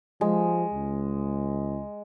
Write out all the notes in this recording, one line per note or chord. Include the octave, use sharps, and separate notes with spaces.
F3 G#3
C#2